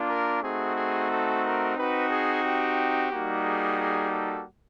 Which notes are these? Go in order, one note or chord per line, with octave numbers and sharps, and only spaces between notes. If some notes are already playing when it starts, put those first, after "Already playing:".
Already playing: A#3 D4 F4
A#4
A3 C4 D#4 F#4 G#4
G#4
A4
A#4
C4 D#4 F#4 B4
G#4
G4
G3 A#3 D#4 F#4
G#4
G#4
A4